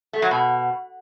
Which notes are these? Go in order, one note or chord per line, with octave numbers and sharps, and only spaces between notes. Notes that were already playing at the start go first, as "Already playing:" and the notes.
A3
F#3
B2